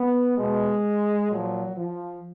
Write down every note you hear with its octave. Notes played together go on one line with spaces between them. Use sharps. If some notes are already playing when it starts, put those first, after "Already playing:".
Already playing: B3
B2 G#3
A#2 F3 F#3
F3